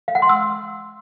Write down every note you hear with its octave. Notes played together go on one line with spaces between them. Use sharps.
F5
F#5
C6
E6